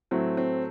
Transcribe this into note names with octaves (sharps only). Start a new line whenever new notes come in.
A2 F#3 A3 C4
C4